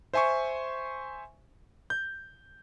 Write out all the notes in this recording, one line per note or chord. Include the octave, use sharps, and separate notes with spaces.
C5 E5 G#5 C6 C#6
G6